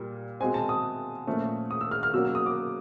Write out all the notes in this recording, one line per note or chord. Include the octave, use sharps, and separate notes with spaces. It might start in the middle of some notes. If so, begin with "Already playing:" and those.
Already playing: A#2 G3 A#3
B2 G#3 C4 G#5
A5
D#6
A#2 F3 A3 C#4
D#6
E6
F6
F6
B2 F#3 A#3 C#4 E6
E6
D#6
D6